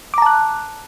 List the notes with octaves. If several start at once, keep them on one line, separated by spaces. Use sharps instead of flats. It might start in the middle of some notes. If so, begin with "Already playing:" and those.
A5 A#5 D6 F#6